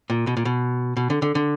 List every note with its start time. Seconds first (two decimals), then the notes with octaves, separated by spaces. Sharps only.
0.10 A#2
0.27 B2
0.37 A#2
0.45 B2
0.97 B2
1.10 D3
1.22 D3
1.35 D3